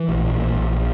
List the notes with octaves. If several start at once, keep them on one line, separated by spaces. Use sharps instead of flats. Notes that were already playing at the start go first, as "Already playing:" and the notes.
Already playing: E3
A#1
A#2
A#1
A#1